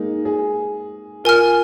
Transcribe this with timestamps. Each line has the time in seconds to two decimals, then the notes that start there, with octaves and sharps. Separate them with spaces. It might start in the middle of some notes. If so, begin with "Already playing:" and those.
Already playing: G#3 A#3 D#4
0.25 G#4
1.24 F4 A#4 G#5 F6